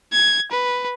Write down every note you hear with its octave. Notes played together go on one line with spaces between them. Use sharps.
G#6
B4